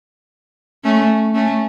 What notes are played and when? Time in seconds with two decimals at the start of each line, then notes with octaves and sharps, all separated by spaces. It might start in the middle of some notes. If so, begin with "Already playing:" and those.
0.84 A3 C#4
1.34 A3 C#4